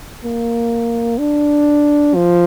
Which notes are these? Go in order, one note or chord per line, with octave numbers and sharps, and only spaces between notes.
A#3
D4
F3